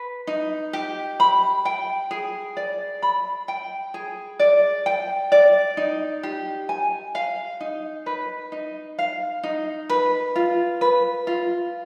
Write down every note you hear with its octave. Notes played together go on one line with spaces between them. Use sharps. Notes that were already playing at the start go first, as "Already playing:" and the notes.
Already playing: B4
D#4
G4
B5
G5
G#4
D5
B5
G5
G#4
D5
G5
D5
D#4
G4
G#5
F5
D#4
B4
D#4
F5
D#4
B4
F4
B4
F4